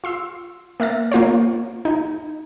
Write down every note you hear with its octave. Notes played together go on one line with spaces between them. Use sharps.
F4 C6 E6
A#3 E5 F6 A6
A#3 F4 C5 C#5
D#4